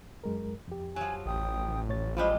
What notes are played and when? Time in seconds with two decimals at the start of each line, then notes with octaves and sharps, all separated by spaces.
0.24 F#2 G#3 A#4
0.68 F2 G4
0.96 F3 F#3 G#5
1.26 A1 G5 D#6
1.89 A2 C#5 A6
2.17 F3 G3 G#3 F4 C5 B5 C6